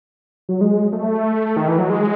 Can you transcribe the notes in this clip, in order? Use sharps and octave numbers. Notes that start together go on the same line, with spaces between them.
F#3
G#3
A3
D#3
E3
F#3
G#3